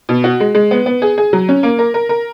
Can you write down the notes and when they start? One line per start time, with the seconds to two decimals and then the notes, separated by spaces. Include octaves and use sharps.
0.09 B2
0.24 F#4
0.40 G#3
0.55 G#3
0.71 B3
0.86 B3
1.02 G#4
1.18 G#4
1.33 F#3
1.49 C#4
1.63 A#3
1.79 A#4
1.94 A#4
2.09 A#4